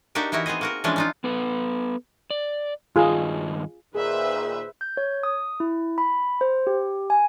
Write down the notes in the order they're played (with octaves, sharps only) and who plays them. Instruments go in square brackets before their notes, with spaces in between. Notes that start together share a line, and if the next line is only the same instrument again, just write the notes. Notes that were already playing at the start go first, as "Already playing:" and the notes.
[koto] A#3 D4 D#4 F#4 G4 A#4
E3 D#4 E4 F#4 A#4
B3 C4 G#4 D#5
A#3 F#4 A#4
E3 F3 G#3 C#4 D4
D4 D#4 F4
[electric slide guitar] B3 A4 B4
D5
[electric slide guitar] G2 D#3 D#5 [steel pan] F4 G#4
[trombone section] A#2 D#3 [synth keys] G#4 [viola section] B4 C5 E5
[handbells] G6
C#5
D#6
E4
B5
C5
G4
G#5